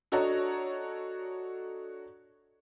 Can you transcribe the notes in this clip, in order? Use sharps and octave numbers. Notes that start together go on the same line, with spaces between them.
D4 F#4 A4 C#5 D#5 A#5